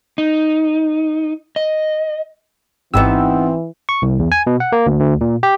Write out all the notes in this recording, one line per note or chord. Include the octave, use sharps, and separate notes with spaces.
D#4
D#5
G#1 E3 B3 C4 D#4 G4 E6
C#6
C2
E2
G#5
B2
F#5
A#3
D2
D2
A#2
G4